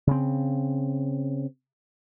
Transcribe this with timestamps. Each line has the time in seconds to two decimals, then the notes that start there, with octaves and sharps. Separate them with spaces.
0.07 C#3 C4